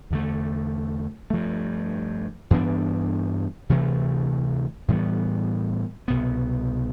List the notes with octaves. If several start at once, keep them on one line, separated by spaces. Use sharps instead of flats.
E2 D3 A3
G2 F3 A3
G2 E3 B3 D4
D2 C3 E3 A3
A2 E3 G3 B3
C2 B2 B3